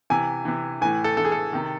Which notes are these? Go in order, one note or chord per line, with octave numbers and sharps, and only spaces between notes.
C3 E3 G#5
C3 E3
A2 E3 G#5
A4
A2 E3 A4
G#4
A4
C3 D#3